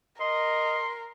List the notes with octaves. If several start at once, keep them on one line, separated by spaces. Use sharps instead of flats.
A#4 D#5 C6